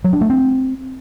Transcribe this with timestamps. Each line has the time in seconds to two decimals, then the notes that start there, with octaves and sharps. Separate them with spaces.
0.04 F#3
0.13 D4
0.21 A3
0.30 C4